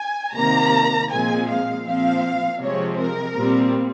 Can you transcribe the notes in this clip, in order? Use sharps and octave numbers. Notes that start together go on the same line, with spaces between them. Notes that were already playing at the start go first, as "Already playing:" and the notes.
Already playing: G#5
C3 D#3 A#3 A#5
A#2 F3 G#3 C4 G#5
F5
A#2 F3 C4 F5
C3 F3 G#3 C4 C#5
A#4
A#2 G3 C4